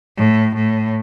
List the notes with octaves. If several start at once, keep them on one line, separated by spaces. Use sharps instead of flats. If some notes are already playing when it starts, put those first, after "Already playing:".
A2
A2